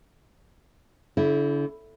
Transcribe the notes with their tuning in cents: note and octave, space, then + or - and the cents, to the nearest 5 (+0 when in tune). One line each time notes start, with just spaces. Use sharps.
D3 -40 A3 +0 E4 +0